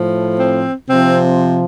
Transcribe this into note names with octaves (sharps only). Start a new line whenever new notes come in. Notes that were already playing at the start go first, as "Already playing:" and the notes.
Already playing: A2 F3
C4
C3 F3 C4